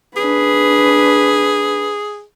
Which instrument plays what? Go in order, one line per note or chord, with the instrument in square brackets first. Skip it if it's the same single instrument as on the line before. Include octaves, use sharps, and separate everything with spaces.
[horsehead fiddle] D4 B4 [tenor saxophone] G#4